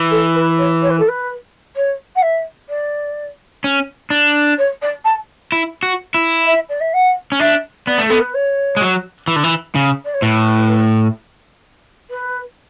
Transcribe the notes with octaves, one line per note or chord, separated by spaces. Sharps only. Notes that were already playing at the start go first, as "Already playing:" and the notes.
Already playing: E3
A4
B4
C#5
C#5
B4
A4
B4
C#5
F#5
E5
D5
C#4
D4
C#5
D5
A5
E4
F#4
E4
E5
D5
E5
F#5
C#4
D4 E5
B3 D5
A3
B3 A4
B4
C#5
G#3
F#3
E3
D3
E3
C#3
D5
C#5
A2 B4
B4